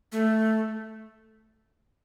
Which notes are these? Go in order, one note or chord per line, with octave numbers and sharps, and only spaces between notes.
A3